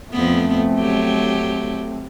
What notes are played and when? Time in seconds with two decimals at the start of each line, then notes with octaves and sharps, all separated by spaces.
0.12 F2 A3 B3 C4
0.78 F#3 G4